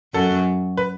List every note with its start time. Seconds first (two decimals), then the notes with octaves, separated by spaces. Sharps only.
0.14 F#2 F#3 A4
0.77 B4